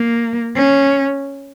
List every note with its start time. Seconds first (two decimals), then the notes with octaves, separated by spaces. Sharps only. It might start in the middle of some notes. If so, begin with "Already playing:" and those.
Already playing: A#3
0.56 C#4